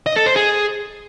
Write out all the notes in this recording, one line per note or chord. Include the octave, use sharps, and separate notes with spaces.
D#5
A4
C5
G#4